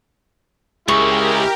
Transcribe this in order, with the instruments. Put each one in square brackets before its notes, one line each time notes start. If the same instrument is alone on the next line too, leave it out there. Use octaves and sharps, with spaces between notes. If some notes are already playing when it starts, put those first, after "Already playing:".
[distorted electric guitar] C#2 [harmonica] G#3 E4 G#4 [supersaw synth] G4 A#4 [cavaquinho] C#6